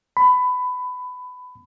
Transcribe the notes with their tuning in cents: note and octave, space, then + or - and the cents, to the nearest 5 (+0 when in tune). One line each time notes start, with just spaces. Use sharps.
B5 +20